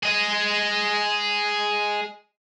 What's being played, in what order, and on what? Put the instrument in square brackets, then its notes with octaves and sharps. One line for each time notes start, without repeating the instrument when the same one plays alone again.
[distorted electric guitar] G#4 D#5